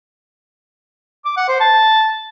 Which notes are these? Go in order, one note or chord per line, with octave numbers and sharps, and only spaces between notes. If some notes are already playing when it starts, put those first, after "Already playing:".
D6
F#5
C5
A5